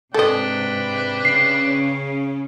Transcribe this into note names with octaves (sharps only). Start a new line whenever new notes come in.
G#2 C3 D4 A4 B4 D#5 G5
C#3 C#4 C7